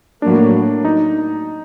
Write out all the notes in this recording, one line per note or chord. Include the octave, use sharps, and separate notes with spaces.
A2 F#3 A#3 D4
D#4